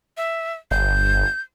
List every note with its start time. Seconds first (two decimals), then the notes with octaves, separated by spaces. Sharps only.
0.17 E5
0.71 G1 G6